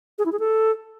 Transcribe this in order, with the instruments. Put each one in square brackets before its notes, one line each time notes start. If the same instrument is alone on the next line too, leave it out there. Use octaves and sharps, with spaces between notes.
[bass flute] G#4
E4
G#4
A4